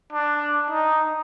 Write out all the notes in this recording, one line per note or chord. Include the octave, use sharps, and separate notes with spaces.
D4
D#4